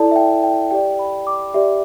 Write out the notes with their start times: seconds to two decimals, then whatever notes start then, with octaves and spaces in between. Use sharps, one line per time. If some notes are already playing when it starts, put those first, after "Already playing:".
Already playing: E4 A4 D5 A5
0.11 E5
0.16 G5
0.43 G5
0.71 G4 D5 G5
0.99 B5
1.27 D6
1.54 G4 D5 E5